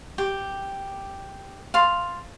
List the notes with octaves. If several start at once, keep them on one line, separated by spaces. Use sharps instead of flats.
G4
F5 A5 C6